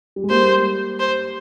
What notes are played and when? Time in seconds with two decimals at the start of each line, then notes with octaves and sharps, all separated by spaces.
0.16 G3
0.24 G#3
0.30 G3 A#3 C5
1.00 C5